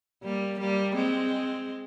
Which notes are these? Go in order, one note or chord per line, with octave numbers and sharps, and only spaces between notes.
G3 A#3
G3 A#3
G#3 C4